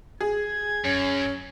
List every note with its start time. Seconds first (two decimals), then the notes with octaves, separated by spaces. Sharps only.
0.21 G#4 G#6
0.85 F#2 C#4